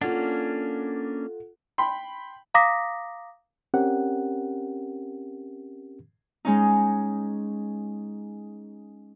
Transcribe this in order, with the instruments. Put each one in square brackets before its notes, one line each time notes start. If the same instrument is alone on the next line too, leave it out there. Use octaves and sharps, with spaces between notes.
[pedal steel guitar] A#3 C#4 D4 [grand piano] F4 F#5 [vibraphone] A4
[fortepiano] G5 B5 C6
[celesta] F5 A#5 D6 D#6 A#6 B6
[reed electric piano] C4 C#4 G4 A#4 F#5
[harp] G#3 C#4 D#4